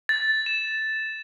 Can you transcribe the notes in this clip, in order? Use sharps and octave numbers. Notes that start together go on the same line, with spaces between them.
A6
E7